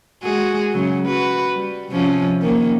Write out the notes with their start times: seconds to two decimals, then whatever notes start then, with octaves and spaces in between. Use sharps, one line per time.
0.23 G#3 F#4 G#4
0.72 C#3 F#3
1.07 F#4 B4
1.53 G3
1.92 C3 F3 C#4
2.42 D#3 A#3 C#4